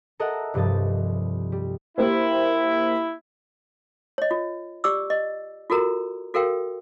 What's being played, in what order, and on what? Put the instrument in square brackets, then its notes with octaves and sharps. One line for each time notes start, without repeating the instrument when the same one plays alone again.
[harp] A4 A#4 D#5 E5 F#5
C2 G2 F3 D#5 A6
G3
[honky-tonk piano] A#3 G4 C5 [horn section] E4
[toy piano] C#5 D#5
F4
G4 D5 D6 E6
D#5
F4 F#4 A4 A#4 A#5
F#4 A4 A#4 F5 G5